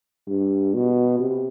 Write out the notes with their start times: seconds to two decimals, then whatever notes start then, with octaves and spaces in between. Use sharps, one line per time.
0.27 G2
0.74 B2
1.19 C3